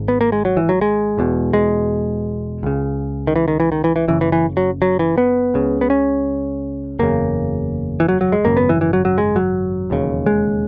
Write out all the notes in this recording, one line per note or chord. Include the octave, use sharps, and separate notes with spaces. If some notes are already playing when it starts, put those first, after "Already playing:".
Already playing: G#1 G#2
B3
A#3
G#3
F#3
E3
F#3
G#3
E1 E2 B2
G#3
C#2 C#3
D#3
E3
D#3
E3
D#3
E3
E3
F#1 F#2 C#3 E3
E3
E3
F#3
F#3
E3
B3
C#2 C#3
B3
C#4
F#1 E2 C#3 A#3
E3
F#3
F#3
G#3
G#1 F#2 C#3 A#3
B3
E3
E3
F#3
F#3
G#3
F#3
E1 D#2 C#3
G#3